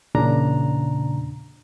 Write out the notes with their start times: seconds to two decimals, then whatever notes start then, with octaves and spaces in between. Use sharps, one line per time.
0.15 E2 A#2 C#3 D4 A#5